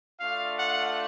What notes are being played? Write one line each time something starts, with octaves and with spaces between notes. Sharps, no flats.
A3 D4 F4 F5
F#5